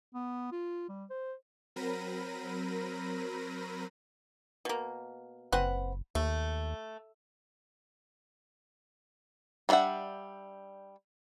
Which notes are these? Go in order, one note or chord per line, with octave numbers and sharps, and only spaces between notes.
B3
F4
G3
C5
F#3 C4 A#4 B5 A#6 D#7
B2 A#3
F#1 C4 B4 F#5
D#2 A3
G3 B3 D4 E5 F#5